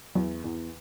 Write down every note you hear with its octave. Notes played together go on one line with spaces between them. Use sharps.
E2 F#3
E2